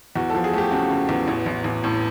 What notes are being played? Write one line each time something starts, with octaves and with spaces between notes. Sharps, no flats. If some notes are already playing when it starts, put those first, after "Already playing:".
E2 F#4
F3 A4
G#4
A3 G4
C#3 F#4
C#3
E2
A1
A1
A1
A2